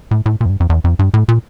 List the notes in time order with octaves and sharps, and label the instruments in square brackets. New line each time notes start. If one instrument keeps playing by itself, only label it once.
[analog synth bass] A2
A2
A#2
F2
G2
F2
E2
F2
G2
A2
A#2